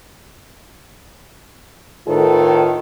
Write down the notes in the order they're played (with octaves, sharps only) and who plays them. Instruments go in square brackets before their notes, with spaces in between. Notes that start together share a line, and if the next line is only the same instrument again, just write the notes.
[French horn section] A2 D#3 F4 A4 B4